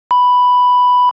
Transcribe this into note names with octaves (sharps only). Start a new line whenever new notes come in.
B5